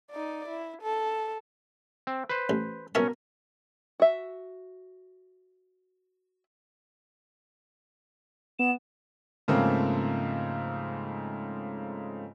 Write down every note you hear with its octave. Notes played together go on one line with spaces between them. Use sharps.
D#4 D5
E4
A4
C4
B4 C5
A1
B2 C#4 A#4 E5 A5
F#4 E5
B3 E7
G#2 C#3 F3 A3 A#3 C4